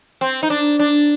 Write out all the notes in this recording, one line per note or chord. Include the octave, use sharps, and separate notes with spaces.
C4
D#4
D4
D4